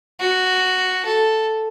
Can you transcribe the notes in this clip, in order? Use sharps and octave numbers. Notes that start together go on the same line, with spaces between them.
F#4
A4